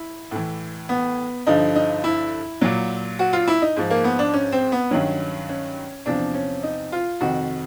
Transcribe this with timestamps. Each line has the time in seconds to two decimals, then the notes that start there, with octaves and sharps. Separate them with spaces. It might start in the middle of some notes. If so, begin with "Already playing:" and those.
Already playing: E4
0.31 A2 E3
0.89 B3
1.47 G2 D3 F3 D#4
1.75 D#4
2.04 E4
2.61 A#2 F#3
3.19 F#4
3.33 F4
3.48 E4
3.62 D#4
3.76 G#2 F3
3.90 A#3
4.04 B3
4.19 D4
4.33 C#4
4.52 C4
4.72 B3
4.91 G2 D#3 F#3 C#4
5.49 C#4
6.06 E2 C3 F3 D4
6.34 C#4
6.63 D#4
6.92 F4
7.20 F2 C3 D#3 F#4